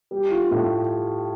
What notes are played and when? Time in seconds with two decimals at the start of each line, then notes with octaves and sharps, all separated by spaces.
0.11 G3
0.31 F4
0.51 A2